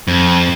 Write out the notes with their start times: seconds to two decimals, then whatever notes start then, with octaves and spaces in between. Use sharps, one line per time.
0.08 F2